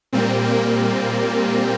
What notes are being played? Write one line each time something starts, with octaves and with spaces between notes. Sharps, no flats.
A#2 G3 A#3 C4
A#3